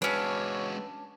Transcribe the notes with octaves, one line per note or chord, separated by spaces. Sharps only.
G#3 C#4 D4 F#4 B4 C#5 E6 B6